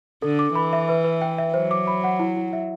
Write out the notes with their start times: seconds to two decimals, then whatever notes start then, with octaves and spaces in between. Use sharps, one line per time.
0.22 D3 A4
0.39 D6
0.55 E3 B5
0.73 E5
0.89 B4
1.04 B4
1.22 G5
1.38 E5
1.54 F#3 C5
1.71 D6
1.87 B5
2.04 F#5
2.19 E4
2.37 E4
2.53 E5